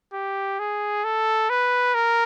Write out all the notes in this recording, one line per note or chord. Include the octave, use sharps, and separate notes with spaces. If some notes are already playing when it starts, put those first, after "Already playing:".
G4
G#4
A4
B4
A#4